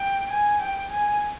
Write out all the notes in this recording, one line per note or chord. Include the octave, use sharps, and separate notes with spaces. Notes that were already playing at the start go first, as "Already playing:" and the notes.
Already playing: G5
G#5
G5
G#5